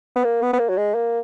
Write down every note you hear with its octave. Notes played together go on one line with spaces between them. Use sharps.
B3
A#3
B3
B3
A#3
F#3
G#3
A#3